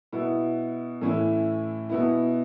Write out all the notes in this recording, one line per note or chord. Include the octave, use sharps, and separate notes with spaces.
B2 B3 E4
A2 E3 C#4 E4
B2 B3 E4